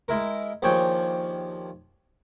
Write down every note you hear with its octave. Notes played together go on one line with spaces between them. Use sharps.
G#3 E4 A#4
D#2 F3 D4 G#4 C#5 G5